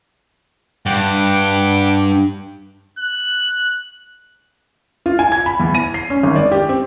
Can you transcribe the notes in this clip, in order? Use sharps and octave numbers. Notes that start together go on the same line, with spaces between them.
G2 F#5 G5 D6
F#6
F4
G#5
G#6
B5
E2
D#7
C7
C#4
G#1
D5
G4
C4